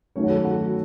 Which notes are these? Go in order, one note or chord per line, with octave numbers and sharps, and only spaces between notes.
D#3 F#3 A3 C#4 C#5
F#4
A4
F#4